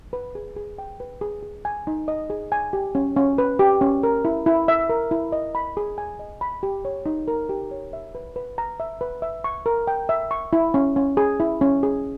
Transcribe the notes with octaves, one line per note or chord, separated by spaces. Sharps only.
B4
G#4
G#4
G5
B4
G#4
G#4
G#5
D#4
D#5
G#4
G#5
G4
C#4
C#4
B4
G4
C#4
A#4
E4
E4
E5
A#4
E4
D#5
B5
G#4
G#5
D#5
B5
G4
C#5
D#4
A#4
G4
C#5
E5
B4
B4
A#5
E5
B4
E5
C#6
A#4
G5
E5
C#6
E4
C#4
C#4
G#4
E4
C#4
G#4